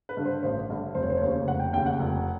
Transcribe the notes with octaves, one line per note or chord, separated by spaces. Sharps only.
B4
G2 D3
C5
A1 C5
G2 D3
F1 C5
C#5
C5
C#5
D#2 C#3 C5
F1 F#5
G5
D#2 C#3 G5
F#5
F1